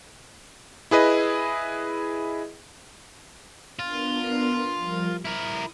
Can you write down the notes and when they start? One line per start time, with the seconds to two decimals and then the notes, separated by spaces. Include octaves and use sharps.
0.91 E4 G#4 B4 D#5
3.79 B3 D4 F4 A#4
4.76 F3 G3 A#4
5.25 E4 A#4 D#6